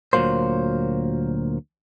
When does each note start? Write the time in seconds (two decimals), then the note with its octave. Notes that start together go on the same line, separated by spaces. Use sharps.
0.13 D2 A#2 E3 F#3 A#3 C5